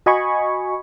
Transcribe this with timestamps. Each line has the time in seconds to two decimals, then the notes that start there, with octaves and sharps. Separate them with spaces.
0.06 F#4 D#5 G#5 B5 C#6